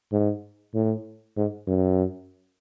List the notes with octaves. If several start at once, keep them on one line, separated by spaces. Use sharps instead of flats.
G#2
A2
G#2
F#2